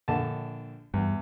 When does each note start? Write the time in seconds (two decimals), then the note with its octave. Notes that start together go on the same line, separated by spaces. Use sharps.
0.08 A#1 D3 A5
0.94 E2 G2